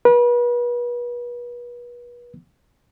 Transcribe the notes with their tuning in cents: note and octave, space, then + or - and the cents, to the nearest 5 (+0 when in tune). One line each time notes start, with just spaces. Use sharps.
B4 -35